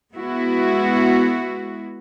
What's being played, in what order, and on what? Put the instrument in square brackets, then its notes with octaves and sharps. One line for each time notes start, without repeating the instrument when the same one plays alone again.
[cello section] G#3 B3 E4 F#4